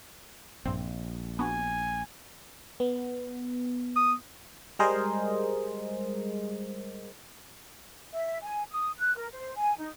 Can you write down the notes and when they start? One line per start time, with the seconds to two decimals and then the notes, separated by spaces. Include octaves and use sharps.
0.65 A#1 G2 C4
1.39 B3 D4 F#4 G#5
2.80 B3
3.96 D#6
4.79 G3 G#3 G#4 A#4 C5 D#5
8.12 E5
8.44 G#5
8.71 D#6
8.99 F#6
9.16 A#4
9.32 C5
9.56 G#5
9.78 D#4